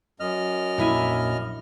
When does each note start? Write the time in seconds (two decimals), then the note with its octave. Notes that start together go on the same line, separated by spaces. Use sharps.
0.20 F#2 D#5 F6
0.78 A#1 F2 D4 E4 G#5